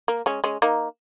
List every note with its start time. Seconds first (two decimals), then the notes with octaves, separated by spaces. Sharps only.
0.08 A#3
0.26 G#3 C#4
0.44 G#3 C#4
0.62 A#3 D#4